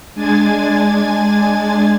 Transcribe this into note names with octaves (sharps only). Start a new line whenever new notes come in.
G#3 D4 G#5 G#6 A6